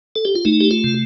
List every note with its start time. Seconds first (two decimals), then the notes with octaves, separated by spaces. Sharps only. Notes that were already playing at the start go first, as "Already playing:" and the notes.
0.16 A4
0.25 G4
0.35 F4
0.45 A3 D#4
0.61 G4
0.71 F4
0.84 C3